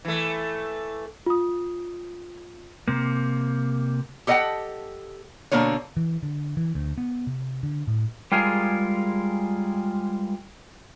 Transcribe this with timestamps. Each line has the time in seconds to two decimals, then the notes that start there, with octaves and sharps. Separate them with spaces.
0.05 E3 A3
1.26 F4 D#6
2.88 C3 A#3
4.27 G4 A4 D#5 E5 F#5 G5
5.52 B2 D3 A#3 D4 F4 C#5
5.97 E3
6.23 D3
6.57 E3
6.75 D2
6.98 B3
7.27 C3
7.63 D3
7.87 A2
8.32 G3 G#3 F4 G#4 A#4